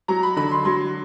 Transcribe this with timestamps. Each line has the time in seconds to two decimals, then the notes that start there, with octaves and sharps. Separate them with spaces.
0.08 F#3 A#5
0.23 B5
0.36 D3 B5
0.51 C6
0.65 F#3 C6